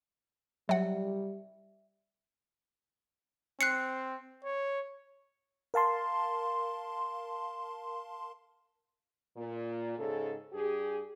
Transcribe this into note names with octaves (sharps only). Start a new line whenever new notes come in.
F#3 G3 E5 F#5
C4 F#6 C7 C#7
C#5
A#4 F5 A5 C6
A#2
G#2 C#3 G#3 A4
G2 G4 G#4